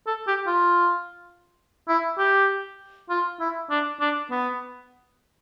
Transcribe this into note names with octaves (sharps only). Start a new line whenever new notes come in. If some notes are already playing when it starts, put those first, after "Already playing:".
A4
G4
F4
E4
G4
F4
E4
D4
D4
B3